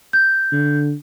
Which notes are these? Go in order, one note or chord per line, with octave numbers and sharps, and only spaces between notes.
G6
D3